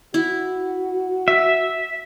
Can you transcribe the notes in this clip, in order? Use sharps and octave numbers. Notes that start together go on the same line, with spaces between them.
E4 F#4
E5